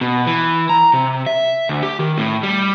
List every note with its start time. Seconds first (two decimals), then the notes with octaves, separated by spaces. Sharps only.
0.01 B2
0.27 E3
0.69 A#5
0.93 C3
1.26 E5
1.69 D2
1.83 G4
1.99 D#3
2.18 A2
2.43 G3